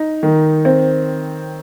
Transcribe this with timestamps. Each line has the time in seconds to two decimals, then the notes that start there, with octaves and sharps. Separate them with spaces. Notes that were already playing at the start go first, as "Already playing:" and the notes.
Already playing: D#4
0.23 D#3
0.65 C4